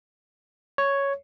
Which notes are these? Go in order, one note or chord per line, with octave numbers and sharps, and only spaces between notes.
C#5